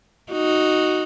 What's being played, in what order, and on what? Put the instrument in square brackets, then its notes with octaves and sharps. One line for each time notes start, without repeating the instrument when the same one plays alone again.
[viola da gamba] D#4 F#4